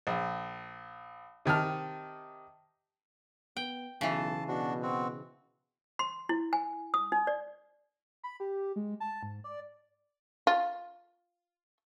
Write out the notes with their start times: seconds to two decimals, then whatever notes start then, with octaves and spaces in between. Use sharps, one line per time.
0.07 A#1
1.45 C3 D#3 A5 F6
3.57 B3 G5
4.01 B1 C#3 E3 A5
4.48 B2 D4 F#4
4.83 C4 F#4
5.99 C6
6.29 E4
6.53 G#5
6.94 D#6
7.12 D#4
7.27 D5
8.24 B5
8.40 G4
8.76 G#3
9.00 A5
9.23 G#2
9.44 D5
10.47 F4